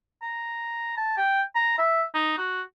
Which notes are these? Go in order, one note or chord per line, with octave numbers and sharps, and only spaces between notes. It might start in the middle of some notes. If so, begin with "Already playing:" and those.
A#5
A5
G5
A#5
E5
D#4
F#4